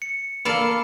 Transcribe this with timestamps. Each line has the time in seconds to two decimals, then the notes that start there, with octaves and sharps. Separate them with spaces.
0.02 C#7
0.45 A#3 A4 D5 F5 B5 C#7 E7